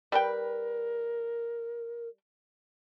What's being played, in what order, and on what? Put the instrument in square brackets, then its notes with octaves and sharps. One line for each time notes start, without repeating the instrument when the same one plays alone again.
[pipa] G3 B4 G5 [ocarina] A#4